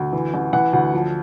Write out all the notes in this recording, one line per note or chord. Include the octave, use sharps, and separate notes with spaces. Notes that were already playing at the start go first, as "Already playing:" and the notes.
Already playing: D2
E3
A1
E3 F#5
D2
F3